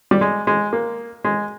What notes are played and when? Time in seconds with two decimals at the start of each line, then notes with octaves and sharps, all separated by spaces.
0.11 G3
0.21 G#3
0.47 G#3
0.73 A#3
1.25 G#3